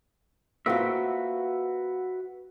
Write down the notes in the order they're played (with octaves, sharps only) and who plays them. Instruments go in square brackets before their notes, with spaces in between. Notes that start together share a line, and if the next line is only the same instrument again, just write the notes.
[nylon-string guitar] A#3 C4 F4 [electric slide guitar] F#4 B4 E5